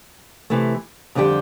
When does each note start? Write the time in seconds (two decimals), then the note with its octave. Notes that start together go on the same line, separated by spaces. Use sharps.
0.50 C3 E3 A3
1.15 F2 D3 G3 D4 G4